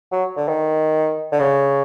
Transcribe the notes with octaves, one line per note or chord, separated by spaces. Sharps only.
F#3
D3
D#3
D3
C#3